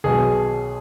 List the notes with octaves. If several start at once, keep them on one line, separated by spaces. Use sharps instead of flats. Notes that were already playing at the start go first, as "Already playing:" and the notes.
B1 B2 F#3 G#4